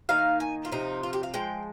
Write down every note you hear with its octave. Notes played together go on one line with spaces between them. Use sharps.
D#3 A#3 D#4 F5
G#5
F4
C3 F3 C4 D#4
F4
G4
F5
F3 G#3 G5